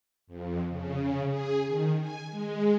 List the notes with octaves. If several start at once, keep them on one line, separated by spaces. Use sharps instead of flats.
F2
C#3
G#4
D#3
G#5
G#3